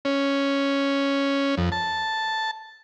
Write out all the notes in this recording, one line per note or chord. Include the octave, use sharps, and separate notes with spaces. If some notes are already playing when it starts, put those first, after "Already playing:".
C#4
F2
A5